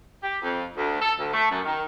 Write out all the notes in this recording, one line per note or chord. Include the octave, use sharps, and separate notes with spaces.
G4
F2
D2
A4
D2
A3
F#2
D#3